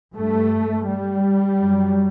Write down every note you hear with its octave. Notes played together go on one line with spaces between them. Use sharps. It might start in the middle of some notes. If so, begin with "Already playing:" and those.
G2 A3
G3
F#2